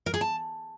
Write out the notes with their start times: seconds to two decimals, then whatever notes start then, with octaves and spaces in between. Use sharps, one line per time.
0.06 A#4
0.14 G#4
0.21 A5